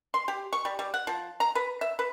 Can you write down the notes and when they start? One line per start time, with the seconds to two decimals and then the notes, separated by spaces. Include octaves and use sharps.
0.14 C6
0.28 G4
0.53 C#6
0.65 G3
0.79 G3
0.94 F#5
1.07 F3
1.40 A#5
1.55 B4
1.81 E5
1.99 B4